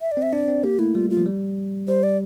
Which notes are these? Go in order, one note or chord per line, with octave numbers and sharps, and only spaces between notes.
E5
D5
C4
E5
D4 D5
C4
A#3 G4
A3 E4
G3 F4
F4
F3
G3
G3 C5
D5